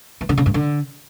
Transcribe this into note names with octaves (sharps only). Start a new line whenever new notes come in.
E3
D3
C#3
G2
D3